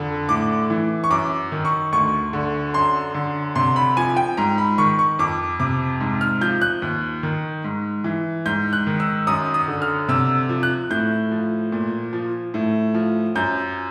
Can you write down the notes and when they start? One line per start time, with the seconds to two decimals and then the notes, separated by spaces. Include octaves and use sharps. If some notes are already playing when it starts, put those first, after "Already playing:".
Already playing: F2 D3
0.29 A2 D6
0.70 E3
1.04 C#6
1.10 F#2 D6
1.52 D#3
1.65 C#6
1.92 D2 C#6
2.33 D3
2.74 F#2 C6
3.14 D3
3.56 C3 C6
3.76 B5
3.97 F3 G#5
4.17 G5
4.37 G#2 A#5
4.58 B5
4.78 D#3 C#6
4.99 C#6
5.19 F2 D6
5.60 C3 D6
6.00 G#2
6.21 F6
6.41 F3 G6
6.61 F#6
6.82 D#2
7.23 D#3
7.64 G#2
8.04 E3
8.46 G#2 G6
8.73 F#6
8.87 D#3
9.00 E6
9.27 F#2 D#6
9.54 D#6
9.68 D3
9.82 F6
10.09 C3 E6
10.49 F3
10.63 F#6
10.90 A2 G6
11.32 F3
11.72 A#2
12.13 F3
12.54 A2
12.94 F3
13.35 F#2 G6